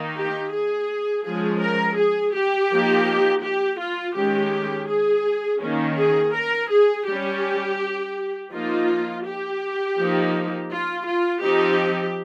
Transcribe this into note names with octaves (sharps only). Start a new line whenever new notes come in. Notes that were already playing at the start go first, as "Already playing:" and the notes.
Already playing: D#3 A#3 D#4
G4
G#4
F3 G#3 C#4 G#4
A#4
G#4
G4
F3 A#3 D#4
G4
F4
D#3 G#3 C#4 G4
G#4
D#3 A#3 C#4
G#4
A#4
G#4
G3 C#4 G4
F3 A#3 D#4 F4
G4
F3 A#3 D#4
F4
F4
F3 C4 D#4 G4